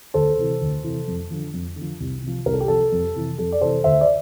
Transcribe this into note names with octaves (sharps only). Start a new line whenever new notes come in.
D2 A4 C5
C3 E3
D2
C3 E3
F2
D3 F3
F2
D3
F3
C2
C3 F3
C2 A#4
A4
G4
C3 F3 A4
F2
C3 E3
F2 A4
D5
C3 E3 A4 C5
D2 C5 E5
D5